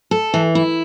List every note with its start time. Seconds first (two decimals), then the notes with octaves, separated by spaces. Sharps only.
0.11 A4
0.34 E3
0.55 E4